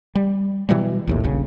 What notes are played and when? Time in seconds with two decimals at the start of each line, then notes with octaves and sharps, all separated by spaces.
0.15 G3
0.69 B2 E3 F#3 G3
1.07 A#1 D#2 A2
1.24 D#1 A#1 C#3